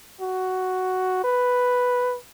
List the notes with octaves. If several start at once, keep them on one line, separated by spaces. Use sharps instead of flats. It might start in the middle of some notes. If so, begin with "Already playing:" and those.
F#4
B4